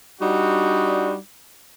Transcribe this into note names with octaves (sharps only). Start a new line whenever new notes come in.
G3 D4 D#4 F#4